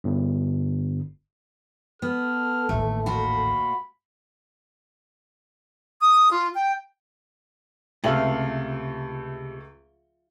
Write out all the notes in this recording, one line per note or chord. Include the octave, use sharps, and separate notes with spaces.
G1
B3 A4 F6
A1 D#2 A3
A#2 F4 F#4 B5
D#6
F4
G5
C#2 C3 A3 F4 E5 F5 F#7